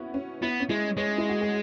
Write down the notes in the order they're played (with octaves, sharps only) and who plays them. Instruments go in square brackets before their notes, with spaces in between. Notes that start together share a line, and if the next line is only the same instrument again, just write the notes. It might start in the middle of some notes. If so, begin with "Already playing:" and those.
Already playing: [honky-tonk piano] B3 C#4 E4 F#4
C#4
[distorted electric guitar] B3 [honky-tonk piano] E4
[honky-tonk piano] C#4
[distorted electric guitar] G#3 [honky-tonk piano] E4
[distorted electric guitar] G#3 [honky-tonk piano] C#5
[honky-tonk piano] E4
F#4
G#4